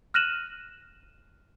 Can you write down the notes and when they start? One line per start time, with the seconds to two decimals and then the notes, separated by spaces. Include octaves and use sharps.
0.14 F6 F#6 A#6 D#7 E7 F#7